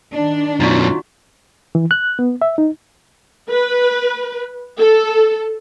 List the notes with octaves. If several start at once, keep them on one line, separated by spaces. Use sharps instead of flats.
D#3 D4
F#2 B2 D#4 F4 F#4
E3
F#6
B3
E5
D#4
B4
A4